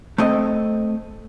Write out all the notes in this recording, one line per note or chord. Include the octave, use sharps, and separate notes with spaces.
A3 C4 D#5